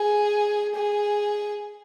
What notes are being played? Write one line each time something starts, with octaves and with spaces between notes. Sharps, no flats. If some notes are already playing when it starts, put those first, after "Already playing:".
Already playing: G#4
G#4